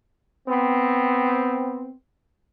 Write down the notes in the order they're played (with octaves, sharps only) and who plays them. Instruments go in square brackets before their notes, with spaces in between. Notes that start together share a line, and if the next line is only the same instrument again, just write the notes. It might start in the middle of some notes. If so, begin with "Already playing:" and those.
[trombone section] B3 C4